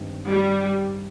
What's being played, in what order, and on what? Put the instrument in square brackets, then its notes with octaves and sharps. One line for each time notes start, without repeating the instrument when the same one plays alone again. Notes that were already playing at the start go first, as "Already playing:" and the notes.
Already playing: [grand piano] G2 D#3 G#3 C4
[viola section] G3